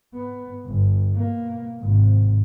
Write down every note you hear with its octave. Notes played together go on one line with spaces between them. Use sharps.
B3
G1
B2 A#3
G#1 C3